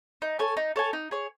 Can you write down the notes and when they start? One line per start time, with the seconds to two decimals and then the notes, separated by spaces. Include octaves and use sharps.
0.22 D#4
0.39 A4 C#5 G#5
0.57 D#4
0.76 A4 C#5 G#5
0.93 D#4
1.11 G#4 C#5